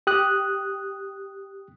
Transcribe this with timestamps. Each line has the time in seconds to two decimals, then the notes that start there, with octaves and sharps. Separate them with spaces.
0.07 G4 D#6 F#6